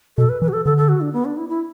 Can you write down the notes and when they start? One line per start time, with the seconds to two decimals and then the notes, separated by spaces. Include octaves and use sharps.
0.17 B2 A4
0.29 B4
0.42 E3 B4
0.48 F#4
0.53 A4
0.65 D3 A4
0.77 A4
0.89 F#4
1.01 D4
1.13 B3
1.25 D4
1.37 E4
1.49 E4